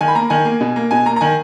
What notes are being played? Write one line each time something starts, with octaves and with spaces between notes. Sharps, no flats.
D#3 G#5
B5
A#3 A#5
D#3 G#5
A#3
B2
A#3
B2 G#5
A#3 A#5
A#5
D#3 G#5